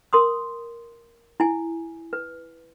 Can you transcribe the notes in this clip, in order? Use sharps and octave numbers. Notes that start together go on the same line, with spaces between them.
A#4 C6 D#6
E4 G#5
B4